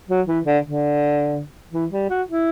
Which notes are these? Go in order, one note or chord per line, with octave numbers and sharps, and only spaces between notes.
F#3
E3
D3
D3
E3
G3
F#4
E4